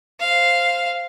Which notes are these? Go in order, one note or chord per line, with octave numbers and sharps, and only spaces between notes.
C5 F5